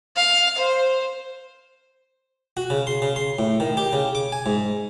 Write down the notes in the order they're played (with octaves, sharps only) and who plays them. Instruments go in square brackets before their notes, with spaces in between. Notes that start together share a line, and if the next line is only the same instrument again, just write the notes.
[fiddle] F5
C5
[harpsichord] F#4
C#3
C6
C#3
C6
A2
D#3
G4
C#3
D6
G#5
G#2